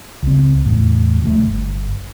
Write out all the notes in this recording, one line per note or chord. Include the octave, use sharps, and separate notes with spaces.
C#2 C4
E2 A2
D2 C3 F#3 A3
G1